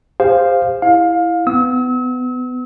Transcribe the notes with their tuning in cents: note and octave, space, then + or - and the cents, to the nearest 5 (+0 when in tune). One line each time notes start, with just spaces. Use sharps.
G4 +45 C5 +0 F5 +0
E4 +0 F5 +20
B3 +25 E6 -40